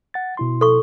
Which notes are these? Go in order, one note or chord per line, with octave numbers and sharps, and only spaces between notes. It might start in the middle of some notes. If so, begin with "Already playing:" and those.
F#5 A6
B2 E4 C6
A4 C#6